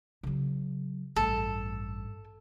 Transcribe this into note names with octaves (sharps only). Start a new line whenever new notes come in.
C#3 F#3
A1 G2 A4